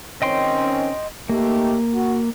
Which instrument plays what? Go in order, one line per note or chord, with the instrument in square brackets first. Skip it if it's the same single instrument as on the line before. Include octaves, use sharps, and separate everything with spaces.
[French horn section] D#3 C4 C#4 [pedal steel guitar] D#5 G5 C6
[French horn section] A3 D#4 G4 [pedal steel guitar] A#3
[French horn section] F#4